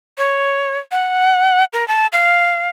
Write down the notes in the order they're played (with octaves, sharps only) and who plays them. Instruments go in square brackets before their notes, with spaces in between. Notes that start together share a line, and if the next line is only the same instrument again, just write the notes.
[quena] C#5
F#5
A#4
A5
F5